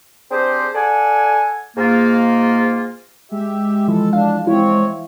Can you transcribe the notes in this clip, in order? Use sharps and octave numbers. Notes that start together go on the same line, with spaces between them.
C4 D4 G4 G#4 C5
A4 D5 F#5 G#5
G#2 A#3 F4
G#3 G4 E5
E3 F3 A4
D4 F5
C4 E4 C#5